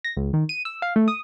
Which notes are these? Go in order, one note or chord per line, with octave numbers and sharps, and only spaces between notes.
A#6
C#2
D#3
D#7
E6
F5
A3
D#6